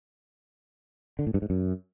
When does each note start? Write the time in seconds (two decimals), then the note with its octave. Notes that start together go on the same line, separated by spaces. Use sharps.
1.19 D3
1.27 A2
1.34 G2
1.42 G#2
1.50 F#2